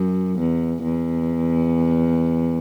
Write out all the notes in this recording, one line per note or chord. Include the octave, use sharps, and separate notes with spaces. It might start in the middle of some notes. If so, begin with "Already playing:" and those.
Already playing: F#2
E2
E2